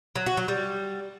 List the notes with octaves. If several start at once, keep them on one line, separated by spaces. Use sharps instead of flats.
F#3
F#4
F#3
G3